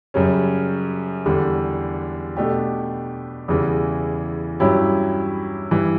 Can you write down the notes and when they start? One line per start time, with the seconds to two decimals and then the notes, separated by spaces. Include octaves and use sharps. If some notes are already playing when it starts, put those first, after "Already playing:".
0.14 F#2 C#3 G3 C#4
1.26 E2 D3 G3
2.37 B2 A3 D4 G4
3.48 E2 C#3 E3 G3
4.60 G2 F#3 C#4 E4 G4
5.71 G2 E3 G3